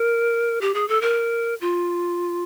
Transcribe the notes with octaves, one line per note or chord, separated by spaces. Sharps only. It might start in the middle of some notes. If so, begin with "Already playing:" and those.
Already playing: A#4
G4
G#4
A4
A#4
F4